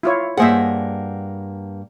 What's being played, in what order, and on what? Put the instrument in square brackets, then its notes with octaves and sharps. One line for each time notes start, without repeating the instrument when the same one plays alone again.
[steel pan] E4 F4 C#5
[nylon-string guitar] G2 A#3 F#5 [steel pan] G#4 C5 E5